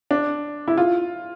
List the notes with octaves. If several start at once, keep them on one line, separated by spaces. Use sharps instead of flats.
D4
E4
F4